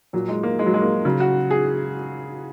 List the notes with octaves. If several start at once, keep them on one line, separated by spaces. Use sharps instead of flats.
A#2 F#3
G#3
A#3
G#3
F#3
G#3
A#3
C#3 F#3
F#4
G#4